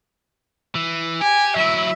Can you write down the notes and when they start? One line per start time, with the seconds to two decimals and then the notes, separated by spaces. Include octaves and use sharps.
0.75 E3
1.22 G4 G#5
1.56 F#3 E4 E5